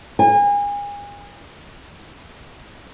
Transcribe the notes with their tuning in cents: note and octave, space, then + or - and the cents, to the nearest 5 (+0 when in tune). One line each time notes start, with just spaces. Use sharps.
G#5 -35